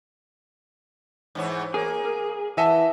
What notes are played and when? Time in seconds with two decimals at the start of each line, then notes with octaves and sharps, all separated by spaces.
1.35 G#2 E3 C#5
1.74 A#3 G#4 A#4 C#5
2.05 A#4
2.57 E3 D#5 E5 F#5 G#5 A5